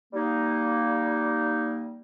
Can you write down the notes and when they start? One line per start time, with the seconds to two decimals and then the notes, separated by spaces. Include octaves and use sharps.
0.13 G3 A#3 D#4